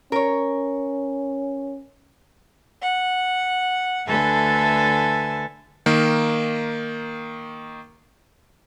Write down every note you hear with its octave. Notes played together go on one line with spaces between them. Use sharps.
C#4 A#4 C#5
F#5
D2 D3 A4 B4 E5 G#5
D#3 A#3